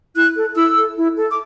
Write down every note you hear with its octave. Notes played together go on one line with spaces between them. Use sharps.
E4 F#6
A4
E4 E6
A4
E4
A4
D6